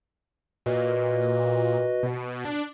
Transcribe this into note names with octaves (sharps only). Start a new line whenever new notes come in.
A#2 F#4 B4 D#5
B2
D4